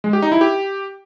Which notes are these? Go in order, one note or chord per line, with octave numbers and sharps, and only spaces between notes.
G#3
G4
D#4
E4
G4